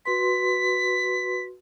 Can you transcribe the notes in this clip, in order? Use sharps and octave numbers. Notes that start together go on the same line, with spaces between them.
F#4 B4 C6 B6